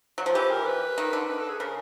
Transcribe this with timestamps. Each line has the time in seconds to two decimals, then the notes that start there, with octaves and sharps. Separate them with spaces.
0.18 F#3
0.26 F3
0.35 E3 G4
0.51 A#4
0.67 B4
0.98 D#3
1.13 D3
1.29 B4
1.39 A4
1.49 G#4
1.60 C#3 A#4